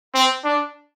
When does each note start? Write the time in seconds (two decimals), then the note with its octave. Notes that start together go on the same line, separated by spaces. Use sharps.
0.14 C4
0.44 D4